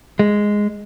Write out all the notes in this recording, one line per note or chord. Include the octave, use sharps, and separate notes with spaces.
G#3